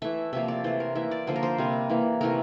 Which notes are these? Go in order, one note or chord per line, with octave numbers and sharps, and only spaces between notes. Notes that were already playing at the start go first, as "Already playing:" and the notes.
E3 A3 E5
C3 F3 A#3 E5
D5
E3 A3 C5
A#4
E3 A#3 E5
D5
D3 F3 A#3 C5
A#4
C5
C3 G3 A#3
E3 A#3
C3 E3 A3 A#4